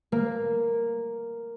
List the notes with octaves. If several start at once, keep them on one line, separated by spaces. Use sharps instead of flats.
A#3